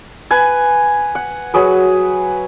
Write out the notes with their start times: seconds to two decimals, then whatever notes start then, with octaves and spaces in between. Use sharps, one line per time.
0.31 B4 G#5
1.15 F#5
1.54 F#3 G#4 B4